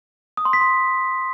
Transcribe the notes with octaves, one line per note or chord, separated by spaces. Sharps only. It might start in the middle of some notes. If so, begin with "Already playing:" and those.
D#6
C6
B6
C6